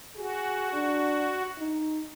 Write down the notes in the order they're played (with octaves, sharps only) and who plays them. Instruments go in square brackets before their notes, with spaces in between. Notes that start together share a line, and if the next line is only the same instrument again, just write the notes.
[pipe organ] F#4 [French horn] G#4
[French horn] D4
D#4